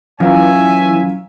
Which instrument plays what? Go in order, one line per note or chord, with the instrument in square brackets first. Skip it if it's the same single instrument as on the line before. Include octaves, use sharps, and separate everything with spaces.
[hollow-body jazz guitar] F#2 [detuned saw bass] E3 [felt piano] F4 F5 A#5 [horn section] C#5 E5 G#5